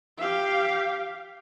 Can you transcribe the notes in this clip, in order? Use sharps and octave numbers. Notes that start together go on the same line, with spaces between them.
G4 F5